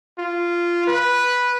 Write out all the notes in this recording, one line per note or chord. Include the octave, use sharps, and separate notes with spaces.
F4
B4